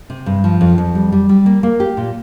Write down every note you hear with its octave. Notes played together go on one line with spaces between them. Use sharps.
C3
G2
F3
F2
F2
G3
G3
G3
A#3
A#3
G4
A#2